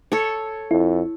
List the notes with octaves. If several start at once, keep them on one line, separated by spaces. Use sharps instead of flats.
A4 C#5
F2 E4